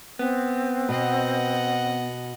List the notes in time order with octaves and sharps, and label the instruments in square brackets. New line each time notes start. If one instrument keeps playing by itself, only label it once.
[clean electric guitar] B3 [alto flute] C4
[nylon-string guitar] B2 [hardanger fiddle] D#5 F#5